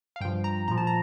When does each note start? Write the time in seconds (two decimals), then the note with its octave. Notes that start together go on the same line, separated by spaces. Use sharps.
0.16 F5
0.21 G2 F3 G5
0.44 A#5
0.68 A#2 F3 A#5
0.78 A5
0.87 A#5